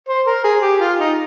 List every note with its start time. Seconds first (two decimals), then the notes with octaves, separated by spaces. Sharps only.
0.09 C5
0.27 A#4
0.44 G#4
0.62 G4
0.80 F4
0.99 D#4